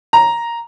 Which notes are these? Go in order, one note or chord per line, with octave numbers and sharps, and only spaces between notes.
A#5